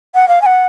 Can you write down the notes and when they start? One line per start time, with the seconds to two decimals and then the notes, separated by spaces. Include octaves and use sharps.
0.14 F#5
0.28 F5
0.42 G#5
0.46 F#5